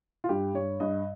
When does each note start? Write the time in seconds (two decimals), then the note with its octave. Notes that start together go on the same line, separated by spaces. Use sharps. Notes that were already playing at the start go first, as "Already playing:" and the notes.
0.24 F4
0.29 G2 G4
0.54 G2 C#5
0.80 G2 D#5